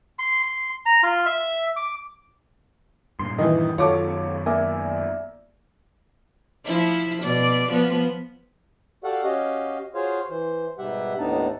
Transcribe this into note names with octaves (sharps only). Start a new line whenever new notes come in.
C6
C6
A#5
F4
E5
D6
G2 A#2 C6
D#3 E3 D#5
F#2 D#3 F4 F#4 A4 C#5 C#6 D6
A#3 D5 E5 G#5
F3 E4
B2 D5
F3 B3
F#4 G4 A4 D5 F5 F#5
C#4 F#4 G4 D#5 F5
F4 F#4 G#4 C5 C#5 F5
E3 C5
G#2 B2 G3 G4 E5 F#5
D#2 A2 B3 D4 D#4 A5